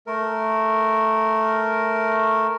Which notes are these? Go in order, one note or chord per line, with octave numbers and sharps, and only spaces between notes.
A3 A#4